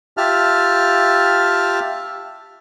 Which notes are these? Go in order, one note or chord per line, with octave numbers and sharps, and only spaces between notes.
F4 G4 E5 A5 F6